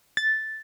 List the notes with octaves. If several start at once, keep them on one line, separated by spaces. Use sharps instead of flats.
A6